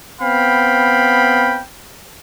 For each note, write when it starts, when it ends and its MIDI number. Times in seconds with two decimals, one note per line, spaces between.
0.21 1.61 59
0.21 1.61 60
0.21 1.61 77
0.21 1.61 79
0.21 1.61 83